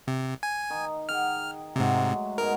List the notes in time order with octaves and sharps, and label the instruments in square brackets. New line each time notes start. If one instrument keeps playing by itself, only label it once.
[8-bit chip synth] C3
G#5
[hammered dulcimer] D#3
[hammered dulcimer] G#4 F#5 G5 [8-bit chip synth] F6
[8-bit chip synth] G#2 C3 [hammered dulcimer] F#3 G#3 A3
[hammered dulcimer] G#2 B2 [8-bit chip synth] A#4